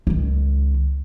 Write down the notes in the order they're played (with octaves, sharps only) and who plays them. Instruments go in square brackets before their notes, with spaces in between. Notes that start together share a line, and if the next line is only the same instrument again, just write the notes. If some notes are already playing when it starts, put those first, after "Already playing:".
[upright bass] C#2 D#3